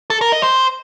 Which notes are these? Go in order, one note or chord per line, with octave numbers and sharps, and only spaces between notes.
A4
A#4
D#5
C5